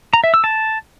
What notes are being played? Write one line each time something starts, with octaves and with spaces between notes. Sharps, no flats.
A#5
E5
E6
A5